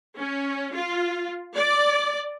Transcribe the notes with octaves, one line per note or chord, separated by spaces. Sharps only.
C#4
F4
D5